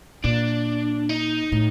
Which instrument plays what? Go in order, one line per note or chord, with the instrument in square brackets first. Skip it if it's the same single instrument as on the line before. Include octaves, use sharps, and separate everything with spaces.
[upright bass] A#2 [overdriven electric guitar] D4
[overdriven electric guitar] D#4
[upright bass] A2